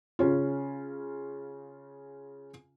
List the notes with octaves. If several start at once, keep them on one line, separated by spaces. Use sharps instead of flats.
C#3 C#4 F4